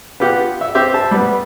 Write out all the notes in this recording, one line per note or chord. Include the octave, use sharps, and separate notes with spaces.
B3 F4 G4 F#5
E5
C4 G4 C5 E5
A5
G3 B3